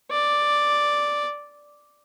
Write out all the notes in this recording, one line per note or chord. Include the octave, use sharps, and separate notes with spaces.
D5